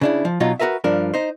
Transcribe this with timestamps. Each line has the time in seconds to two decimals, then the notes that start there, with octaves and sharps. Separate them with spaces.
0.01 C#3 D4 E4
0.25 F3
0.40 B2 F#3 D#4 F4
0.60 F#4 G#4 A#4 B4 E5
0.84 G2 F3 D4 A#4
1.14 D#4 C5